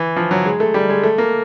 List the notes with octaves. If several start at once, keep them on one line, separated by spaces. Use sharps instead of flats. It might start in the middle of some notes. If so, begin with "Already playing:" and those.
Already playing: E3
F3
F#3
G#3
A3
G3
G#3
A3
A#3